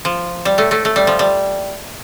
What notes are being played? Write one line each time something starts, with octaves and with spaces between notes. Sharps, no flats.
F3
G3
A2 A3
A2 A3
A3
G3
F3
G3